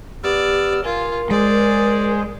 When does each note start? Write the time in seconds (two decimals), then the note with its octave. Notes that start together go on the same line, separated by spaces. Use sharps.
0.24 B3 G4 D5 E6 F6
0.84 F4 A#4 G#5
1.31 G#3 G#4 C5 D5